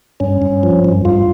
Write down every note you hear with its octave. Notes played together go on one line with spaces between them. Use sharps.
G2 C#4
G2
F3
G2
G2 F4